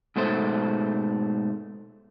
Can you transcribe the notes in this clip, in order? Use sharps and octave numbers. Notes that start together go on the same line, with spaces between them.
G#2 B2 A3 C5